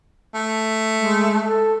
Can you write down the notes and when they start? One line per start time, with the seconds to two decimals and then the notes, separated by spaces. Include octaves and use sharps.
0.35 A3
0.95 G#3
1.44 A4